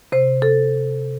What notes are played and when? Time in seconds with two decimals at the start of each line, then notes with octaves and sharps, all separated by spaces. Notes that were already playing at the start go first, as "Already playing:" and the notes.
0.12 C3 C5
0.42 A4